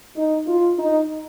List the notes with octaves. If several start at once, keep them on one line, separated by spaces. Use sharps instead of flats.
D#4
F4
D#4